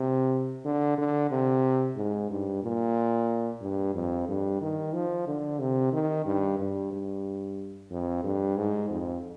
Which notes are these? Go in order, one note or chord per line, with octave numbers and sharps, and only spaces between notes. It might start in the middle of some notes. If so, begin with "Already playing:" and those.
Already playing: C3
D3
D3
C3
G#2
G2
A#2
G2
F2
G2
D#3
F3
D3
C3
D#3
G2
G2
G2
F2
G2
G#2
F2